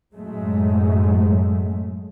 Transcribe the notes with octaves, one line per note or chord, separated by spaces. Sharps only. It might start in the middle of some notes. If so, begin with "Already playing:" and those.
F#2 A2 F#3 G#3 A3